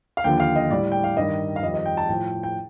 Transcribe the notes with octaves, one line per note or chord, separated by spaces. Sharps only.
F5
D#2 D3 F3 G5
F5
D#5
A2 G3 D5
G5
F5
G2 D#3 G3 D#5
F5
F2 D#3 G3 D#5
D#5
G5
A5
A2 F3 G5
G5